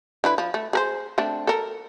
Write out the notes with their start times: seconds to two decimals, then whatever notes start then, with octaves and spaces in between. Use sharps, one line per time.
0.24 D3 E4 B4
0.38 F3
0.54 A3
0.73 G#4 A#4 C5
1.18 A3 C4 D4
1.47 A4 A#4